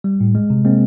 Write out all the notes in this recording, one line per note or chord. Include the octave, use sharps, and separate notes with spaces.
G3
A2
G#3
C3
G#3 A#3 C4